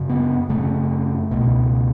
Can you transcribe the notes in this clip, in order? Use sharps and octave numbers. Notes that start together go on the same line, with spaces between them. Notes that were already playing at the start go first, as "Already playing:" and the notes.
Already playing: F#2 C#3
B3
F#2 C#3 A3
C#2 B2